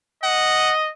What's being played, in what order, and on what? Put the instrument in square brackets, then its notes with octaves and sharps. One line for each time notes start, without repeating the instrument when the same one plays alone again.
[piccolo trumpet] D#5 [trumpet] F#5